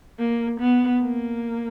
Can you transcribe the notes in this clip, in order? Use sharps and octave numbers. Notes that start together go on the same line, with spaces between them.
A#3
B3
A#3